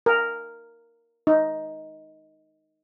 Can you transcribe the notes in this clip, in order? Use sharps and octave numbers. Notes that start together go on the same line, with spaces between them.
A#4
D#4